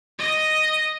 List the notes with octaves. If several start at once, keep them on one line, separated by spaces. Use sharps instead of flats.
D#5